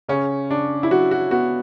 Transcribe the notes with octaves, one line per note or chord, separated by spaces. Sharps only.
C#3 C#4
C#3 D4
E4
F#3 F#4
F#4
B3 F#4